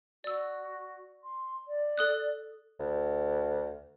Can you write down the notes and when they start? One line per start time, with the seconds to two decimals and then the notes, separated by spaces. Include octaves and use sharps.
0.24 F#4 D5 E6
1.23 C6
1.67 D5
1.98 A4 D#6 F#6
2.80 D2